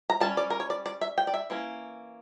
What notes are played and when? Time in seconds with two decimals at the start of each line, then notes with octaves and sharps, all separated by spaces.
0.10 A#5
0.20 G3 C#4 A5
0.37 D5
0.50 A#4
0.60 C#5
0.70 D5
0.86 D5
1.01 E5
1.18 G5
1.27 D5
1.34 E5
1.50 E3 A#3 C#4